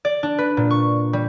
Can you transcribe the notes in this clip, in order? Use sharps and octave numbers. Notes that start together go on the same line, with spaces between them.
D5
D4
B4
A#2
C#6
G3